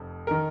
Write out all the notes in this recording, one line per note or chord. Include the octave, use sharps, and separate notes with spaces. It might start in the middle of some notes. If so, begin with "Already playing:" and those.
Already playing: F1 F2
D#3 A#4